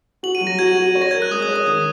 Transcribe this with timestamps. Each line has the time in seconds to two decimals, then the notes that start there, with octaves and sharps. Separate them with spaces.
0.23 F#4 F#7
0.35 D#7
0.41 F#3
0.47 A#6
0.59 F#4 G#6
0.77 F#4
0.95 C#5
1.02 A#6
1.11 A#4 G#6
1.22 F#6
1.31 G#3 D#6
1.42 D#6
1.48 C#5
1.56 D#6
1.66 D#3 D#6